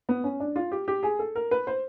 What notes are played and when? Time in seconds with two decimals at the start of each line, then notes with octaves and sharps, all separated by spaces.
0.09 B3
0.24 C#4
0.40 D4
0.56 F4
0.71 G4
0.88 G4
1.03 G#4
1.19 A4
1.35 A#4
1.51 B4
1.67 C5